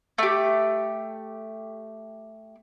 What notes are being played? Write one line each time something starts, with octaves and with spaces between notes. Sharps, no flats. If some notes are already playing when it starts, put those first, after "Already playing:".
A3 G4